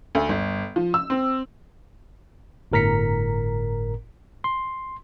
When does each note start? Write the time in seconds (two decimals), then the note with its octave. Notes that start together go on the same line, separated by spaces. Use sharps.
0.15 D2
0.29 G1
0.76 F3
0.94 E6
1.10 C4
2.72 G1 A2 A#4 A#5 B6 C#7
4.44 C6